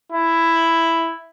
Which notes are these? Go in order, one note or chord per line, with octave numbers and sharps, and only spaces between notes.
E4